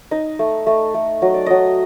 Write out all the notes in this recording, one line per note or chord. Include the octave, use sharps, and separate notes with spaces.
D#4 D#5
A3
A3
A3
F#3 D#5
D5
F#3 D#5